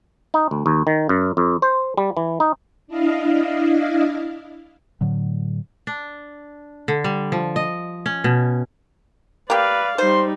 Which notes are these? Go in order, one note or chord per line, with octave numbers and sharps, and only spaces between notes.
D#4
D2
D#2
D#3
F#2
F2
C5
G3
E3
D#4
D4 E4 D#5 F5
A2 D3 F#3
D4
D3
G3
F3
D#5
C#4
B2
A#3 G4 B4 D5 F5
G3 D#4 C5 C6